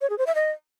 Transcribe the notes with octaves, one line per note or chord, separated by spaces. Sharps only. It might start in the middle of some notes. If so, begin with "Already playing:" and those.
C#5
G#4
C5
E5
D#5